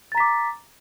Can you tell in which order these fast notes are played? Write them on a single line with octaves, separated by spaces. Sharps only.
A6 A#5 B6 D6